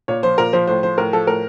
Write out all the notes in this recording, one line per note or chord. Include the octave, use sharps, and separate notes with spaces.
A#2 C#5
F3 C5
A#2 A#4
F3 C5
A2 C5
F3 C5
A2 A#4
F3 A4
A2 A#4